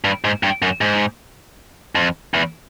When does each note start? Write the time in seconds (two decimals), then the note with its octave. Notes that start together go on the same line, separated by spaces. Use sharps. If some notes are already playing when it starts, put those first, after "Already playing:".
0.04 G2
0.24 G#2
0.43 G2
0.62 F#2
0.81 G#2
1.95 F2
2.34 E2